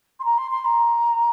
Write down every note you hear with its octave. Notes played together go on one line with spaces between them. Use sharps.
C6
A#5
C6
C6
A#5